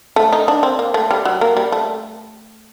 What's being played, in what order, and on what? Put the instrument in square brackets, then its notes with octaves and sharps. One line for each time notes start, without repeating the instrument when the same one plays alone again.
[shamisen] A3
D#4
D4
C4
A#3
A3
G3
F#3
A#3
G3
A3